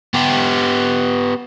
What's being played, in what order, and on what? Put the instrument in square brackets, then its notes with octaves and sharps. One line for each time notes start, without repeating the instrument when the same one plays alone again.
[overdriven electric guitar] B3 G4